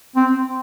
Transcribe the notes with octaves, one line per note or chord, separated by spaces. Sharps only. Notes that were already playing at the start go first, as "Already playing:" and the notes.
C4